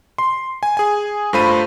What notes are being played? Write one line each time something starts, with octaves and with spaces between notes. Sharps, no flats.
C6
G#5
G#4 G#5
G2 A3 F4 C5 B5 D#7